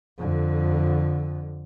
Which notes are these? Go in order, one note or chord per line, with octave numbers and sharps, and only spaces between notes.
F2 D3